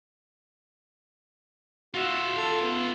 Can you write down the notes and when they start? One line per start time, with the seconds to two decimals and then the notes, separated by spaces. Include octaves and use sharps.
1.94 F4 F#4 E5
2.37 A4
2.62 B3